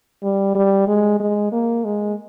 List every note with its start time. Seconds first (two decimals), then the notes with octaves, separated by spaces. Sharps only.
0.23 G3
0.55 G3
0.87 G#3
1.20 G#3
1.52 A#3
1.84 G#3